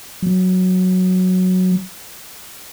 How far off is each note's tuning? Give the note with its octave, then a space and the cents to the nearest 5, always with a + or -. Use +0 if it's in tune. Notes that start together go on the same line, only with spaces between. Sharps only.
F#3 -5